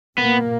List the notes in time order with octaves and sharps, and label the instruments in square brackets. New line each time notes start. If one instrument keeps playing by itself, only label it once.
[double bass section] A#2 A#3 [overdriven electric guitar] B3